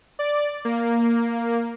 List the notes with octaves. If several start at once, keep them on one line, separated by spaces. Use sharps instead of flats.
D5
A#3